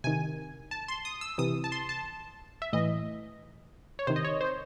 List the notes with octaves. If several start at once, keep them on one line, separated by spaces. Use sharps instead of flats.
C3 D#3 G#5
A5
C6
D#6
E6
C3 E3 D#6
A5
C6
A5
E5
A2 E3 D#5
C#5
C3 D#3 C5
D#5
C#5
C5